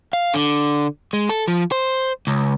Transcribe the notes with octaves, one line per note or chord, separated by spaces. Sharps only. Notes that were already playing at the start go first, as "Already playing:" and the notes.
F5
D3
G#3
A4
F3
C5
C#2